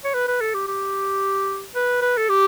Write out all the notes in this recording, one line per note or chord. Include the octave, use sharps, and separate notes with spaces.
C#5
B4
B4
A4
G4
G4
B4
B4
A4
G4